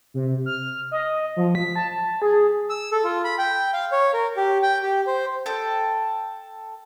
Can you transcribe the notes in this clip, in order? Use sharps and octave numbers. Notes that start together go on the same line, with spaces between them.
C3
F6
D#5
F3
B6
A5
G#4
E6
A4
F4
B5
G5
F5
C#5
A#4
G4
G5
G4
C5
A4 G5